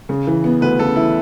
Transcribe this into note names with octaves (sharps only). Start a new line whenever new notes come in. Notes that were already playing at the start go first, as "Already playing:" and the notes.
C#3
E3
B3
D2 B4
C#3 A4
E3 E4